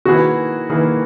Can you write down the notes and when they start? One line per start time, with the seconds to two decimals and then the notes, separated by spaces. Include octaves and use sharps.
0.05 D#3 A#3 E4 F#4 G#4 B4
0.69 D#3 A#3 E4 G#4 B4